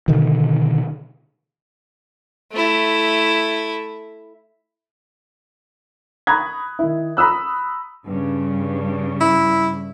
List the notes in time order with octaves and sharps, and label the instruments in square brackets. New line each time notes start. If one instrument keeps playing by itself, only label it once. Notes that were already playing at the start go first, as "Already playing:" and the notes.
[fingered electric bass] B2 D3 D#3
[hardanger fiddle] A3 E4
[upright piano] A#5 B5 C#6 D#6 F#6 G#6
D#3 E4
A#5 B5 D#6 E6 F#6
[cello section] G2 C#3
[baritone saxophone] E4